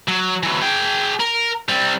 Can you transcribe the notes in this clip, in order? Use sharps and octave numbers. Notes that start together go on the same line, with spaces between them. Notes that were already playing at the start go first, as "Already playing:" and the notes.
F#3
E3 F#3
G#4 G5
A#4
G3 C4